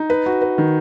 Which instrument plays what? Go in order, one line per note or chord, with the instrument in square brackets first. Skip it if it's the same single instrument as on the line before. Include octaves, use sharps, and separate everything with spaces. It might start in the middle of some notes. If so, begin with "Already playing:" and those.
Already playing: [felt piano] D#4
B4
F#4
B4
D#3